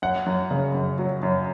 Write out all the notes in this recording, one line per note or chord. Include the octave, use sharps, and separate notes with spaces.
F#2 F#5
F#2
C#3
F#2
F#3
F#2